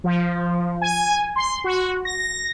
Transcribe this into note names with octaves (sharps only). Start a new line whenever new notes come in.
F3
G#5
C6
F#4
A#6